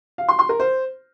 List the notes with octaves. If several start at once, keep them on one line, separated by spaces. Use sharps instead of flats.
F5
C6
C6
A#4
C5